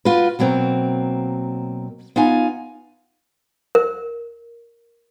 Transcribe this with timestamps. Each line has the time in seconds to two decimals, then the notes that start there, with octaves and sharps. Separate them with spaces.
0.05 F4 F#4 B4
0.39 B2 F#3 A#3 C4
2.16 B3 D#4 F4 F5 G#5
3.75 A#4